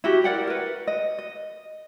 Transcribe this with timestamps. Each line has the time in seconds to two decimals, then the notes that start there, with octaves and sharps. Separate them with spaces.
0.04 E4 F#4 G4
0.24 A#4 D5 F#5 G5
0.47 A#4 B4
0.87 D#5
1.19 D#5